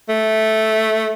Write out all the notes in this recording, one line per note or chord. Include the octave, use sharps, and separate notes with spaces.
A3